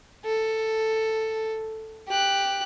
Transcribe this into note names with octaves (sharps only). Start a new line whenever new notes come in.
A4
G4 F#6